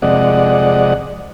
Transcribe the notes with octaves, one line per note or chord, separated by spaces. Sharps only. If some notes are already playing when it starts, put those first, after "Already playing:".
F2 C3 G#3 D5 D#5 F#5